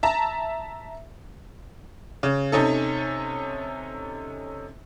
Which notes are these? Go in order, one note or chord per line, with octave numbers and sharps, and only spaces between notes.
E5 A5 A#5
C#3
C3 C#4 D#4 A4